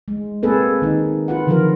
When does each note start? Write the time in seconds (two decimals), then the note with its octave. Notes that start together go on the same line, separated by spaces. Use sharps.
0.08 G#3
0.43 A#3 C4 G#4 A4 B4
0.82 D#3 D#4
1.28 F4 B4 F#5
1.47 D3 D#3 F3 F#3 F4 A#4